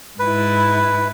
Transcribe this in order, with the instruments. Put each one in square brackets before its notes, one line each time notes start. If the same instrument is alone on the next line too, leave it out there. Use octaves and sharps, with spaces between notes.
[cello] G#2 E4 [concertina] B4